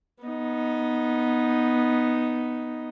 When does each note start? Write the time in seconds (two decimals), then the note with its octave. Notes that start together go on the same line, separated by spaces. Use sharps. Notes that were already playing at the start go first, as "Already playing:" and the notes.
0.23 B3 D#4